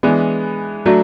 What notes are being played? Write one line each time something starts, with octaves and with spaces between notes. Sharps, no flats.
E3 G#3 B3 D4
F#3 A3 D4 F#4